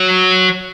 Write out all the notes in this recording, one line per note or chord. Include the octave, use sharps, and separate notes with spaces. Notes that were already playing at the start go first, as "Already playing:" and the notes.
Already playing: F#3